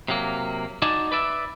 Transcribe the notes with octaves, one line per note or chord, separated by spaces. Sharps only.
C3 F#3 A#3
D#4 F#4 D5 G#5 A5
B4 D5 E5